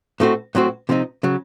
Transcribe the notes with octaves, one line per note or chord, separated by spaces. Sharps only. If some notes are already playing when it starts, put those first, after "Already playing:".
A2 A3 C4 F#4
A2 F#3 C4 F#4
C3 F3 C4 D#4
C#3 F#3